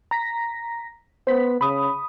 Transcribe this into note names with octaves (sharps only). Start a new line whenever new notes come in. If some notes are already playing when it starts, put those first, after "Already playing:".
A#5 A#6 B6
B3 C5 B6
C#3 B5 D#6